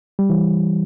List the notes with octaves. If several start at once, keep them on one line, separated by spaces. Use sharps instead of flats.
G3
E3